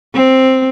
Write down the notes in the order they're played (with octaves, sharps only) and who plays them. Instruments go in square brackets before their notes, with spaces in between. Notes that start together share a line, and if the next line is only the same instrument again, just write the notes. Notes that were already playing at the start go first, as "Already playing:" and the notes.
[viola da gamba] C4